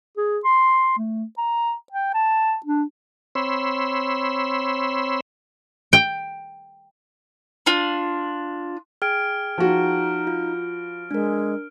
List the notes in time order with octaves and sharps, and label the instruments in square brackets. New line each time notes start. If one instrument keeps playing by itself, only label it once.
[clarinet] G#4
C6
A3
A#5
G5
A5
D4
[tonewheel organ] C4 C#5 B5 C6 E6
[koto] G5
[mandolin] D4 F4
[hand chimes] G#4 G5 G#6 [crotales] F6 D7
[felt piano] F3 F#4 [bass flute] D#4
[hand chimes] F4
[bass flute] G#3 [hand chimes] D4 A#4